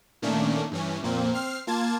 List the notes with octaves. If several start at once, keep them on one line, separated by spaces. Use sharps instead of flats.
A#2 D#3 A3 A#3 C#4 D4
G2 E3 C#4
F2 A#2 A#3 C4
C4 F6 C7
A#3 F4 A5 G#6 A6